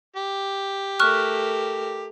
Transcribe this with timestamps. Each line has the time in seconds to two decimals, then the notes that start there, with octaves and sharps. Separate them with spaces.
0.16 G4
1.00 A3 A#4 C#6 F6 F#6